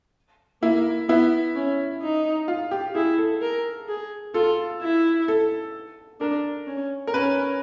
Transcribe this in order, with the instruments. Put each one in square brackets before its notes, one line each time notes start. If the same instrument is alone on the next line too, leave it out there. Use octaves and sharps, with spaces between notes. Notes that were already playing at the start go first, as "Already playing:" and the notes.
[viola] A#3 [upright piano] E4
[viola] B3 [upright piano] E4
[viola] C#4
D#4
[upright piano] F4
G4
[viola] E4 [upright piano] G#4
[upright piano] A4
[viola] A#4
G#4
[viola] F4 [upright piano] A4
[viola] E4
[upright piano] A4
[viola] D4 [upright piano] A#4
[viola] C#4
[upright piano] A#4
[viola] C#4 [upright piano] B4